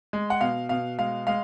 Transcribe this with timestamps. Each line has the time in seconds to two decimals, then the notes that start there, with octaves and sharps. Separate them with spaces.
0.13 G#3
0.30 F#5
0.41 B2 F5
0.69 B2 F5
0.99 G#3 F5
1.27 G#3 F5